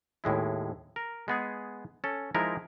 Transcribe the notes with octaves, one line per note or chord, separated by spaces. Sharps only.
D#2 A2 G#3 E4
A#4
G#3 B3 G#4
C#4 A4
F3 G#3 D#4 E4 A#4